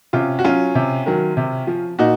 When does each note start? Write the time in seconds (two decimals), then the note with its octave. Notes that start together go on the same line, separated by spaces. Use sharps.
0.13 C3 C#4 F4
0.39 F#4
0.44 F#3 C#4 F4
0.75 C3
1.06 D#3 F#3
1.37 C3
1.67 F3
1.99 A#2 D#4 F#4